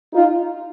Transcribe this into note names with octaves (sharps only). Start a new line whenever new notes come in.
D#4 F4